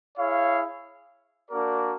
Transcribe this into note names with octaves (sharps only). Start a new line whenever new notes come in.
E4 G#4 C#5 F5
A#3 D4 F#4 A#4 D5